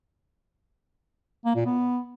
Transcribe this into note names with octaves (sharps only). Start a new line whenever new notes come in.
A#3
A#2
B3